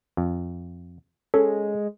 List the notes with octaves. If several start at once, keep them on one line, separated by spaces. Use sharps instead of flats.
F2
G#3 C#4 A4